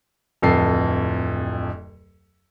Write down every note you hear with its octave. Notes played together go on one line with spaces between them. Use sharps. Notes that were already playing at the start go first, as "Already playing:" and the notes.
D1 F2 A4 C7